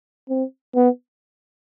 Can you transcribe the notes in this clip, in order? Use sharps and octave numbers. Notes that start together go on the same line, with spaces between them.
C4
B3